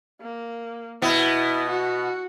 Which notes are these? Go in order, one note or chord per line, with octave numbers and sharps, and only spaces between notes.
A#3
B2 B3 E4
F#4